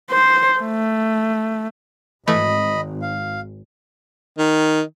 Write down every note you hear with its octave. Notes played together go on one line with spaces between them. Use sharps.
C5
A3
G#1 E3 A3 D#5 B5
F5
D#3